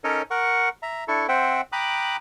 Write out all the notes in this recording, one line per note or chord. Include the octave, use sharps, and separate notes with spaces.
C#4 D#4 A4 A#4 C#5 D#5
A#4 F#5 C#6
E5 A#5
D4 E4 A4 C#6
C4 C5 E5 F#5 G5
G5 A#5 B5 D6 D#6 F#6